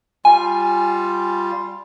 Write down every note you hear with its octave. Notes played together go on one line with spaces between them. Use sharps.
G3 F4 G#5